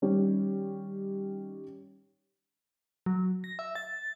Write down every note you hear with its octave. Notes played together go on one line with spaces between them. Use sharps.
D#3 G3 C#4
F#3
A#6
E5
A6